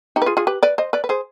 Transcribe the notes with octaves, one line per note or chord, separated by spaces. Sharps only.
D#4 G4
B4
F4 G#4
F4 G#4
G4 B4
B4 D5
C5 D#5
B4 D5
B4
G#4 C5